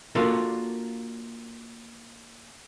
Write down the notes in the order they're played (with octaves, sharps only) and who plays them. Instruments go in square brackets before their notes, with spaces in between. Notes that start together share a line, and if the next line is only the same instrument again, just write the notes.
[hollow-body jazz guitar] A#3 D4 F4 F#4 A4 A#4